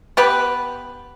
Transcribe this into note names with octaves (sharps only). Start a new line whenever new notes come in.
B3 G4 B4